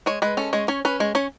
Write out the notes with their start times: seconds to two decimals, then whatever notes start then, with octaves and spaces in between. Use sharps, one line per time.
0.06 G#3 C#5
0.22 G#3 B4
0.37 C#4 A4
0.53 G#3 C#5
0.68 C#4 C#5
0.85 C#4 B4
1.00 G#3 C#5
1.15 C#4 C#5